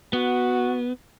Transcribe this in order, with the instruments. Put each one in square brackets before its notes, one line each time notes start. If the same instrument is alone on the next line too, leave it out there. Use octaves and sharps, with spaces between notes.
[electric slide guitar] B3 [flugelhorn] F#4